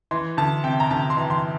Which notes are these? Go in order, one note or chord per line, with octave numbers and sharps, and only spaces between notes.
E3 C6
D2 A5
C3 G5
A#5
D2 A5
C6
E3
C6